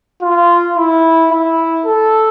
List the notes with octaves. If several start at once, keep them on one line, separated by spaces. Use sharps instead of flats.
F4
E4
E4
A4